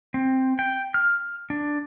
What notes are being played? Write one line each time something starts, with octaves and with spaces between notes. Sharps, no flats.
C4
G5
F6
D4